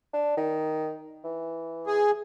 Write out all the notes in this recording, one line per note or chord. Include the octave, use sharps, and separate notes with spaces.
D4
D#3
E3
G#4